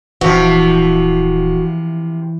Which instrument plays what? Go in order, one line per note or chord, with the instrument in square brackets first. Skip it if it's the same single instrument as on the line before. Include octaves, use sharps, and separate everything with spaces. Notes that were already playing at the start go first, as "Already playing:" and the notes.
[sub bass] D#1 [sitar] C3 F3 [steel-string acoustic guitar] E3 [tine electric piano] F#4